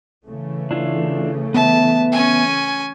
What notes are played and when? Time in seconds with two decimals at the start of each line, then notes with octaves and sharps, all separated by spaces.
0.25 C#3 E3 A3
0.71 D4 E4 F4
1.54 B3 B4 E5 A5
2.12 C#4 G#5